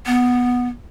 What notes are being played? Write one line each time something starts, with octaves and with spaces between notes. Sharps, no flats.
B3